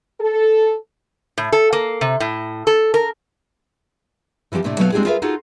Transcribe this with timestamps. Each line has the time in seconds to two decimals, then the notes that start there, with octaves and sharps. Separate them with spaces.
0.20 A4
1.38 A2
1.52 A4
1.73 A#3
2.01 C3
2.20 A2
2.67 A4
2.94 A#4
4.52 E3 F3 C4 F4 G4
4.64 A2 C3 A3 D4
4.78 B2 F#3 A3 B3 B4 F5
4.92 G#3 C4 D4 F4 G4 G#4
5.05 F4 G#4 A#4 B4 E5 F5
5.22 D#4 F4 F#4 G#4 A4